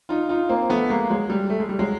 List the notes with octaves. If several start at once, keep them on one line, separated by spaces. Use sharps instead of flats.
D#4 F4
D#4 F4
A#3 C4
A3 B3
G#3 A#3
F#3 G#3
G3
A3
G#3
G3
F#3 G#3